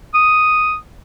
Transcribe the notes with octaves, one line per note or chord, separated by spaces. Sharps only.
D#6